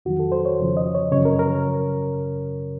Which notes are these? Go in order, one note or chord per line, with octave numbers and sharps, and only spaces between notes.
F2 D#3 F#3 F#4
A4
C5
C#5
F2 C#3 F3
D#5
C#5
F#2 C#3 F#3 C#5
A#4
A#4